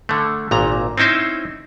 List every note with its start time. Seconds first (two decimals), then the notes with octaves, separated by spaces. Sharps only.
0.09 D3 A3
0.51 G#1 A#2 A#5
0.98 C4 C#4 D#4 E4 C5